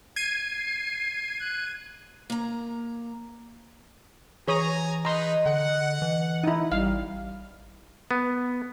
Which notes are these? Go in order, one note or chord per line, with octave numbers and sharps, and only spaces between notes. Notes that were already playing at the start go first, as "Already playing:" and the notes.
G#6 C7 D#7
F#6
A#3 A#5
E3 G#4 C#5 G#5 A#5 D#6
D#4 G#4 B4 D#5 A#5 C6
D3 F#5
E3
D#4 E4
A1 G3 F5
B3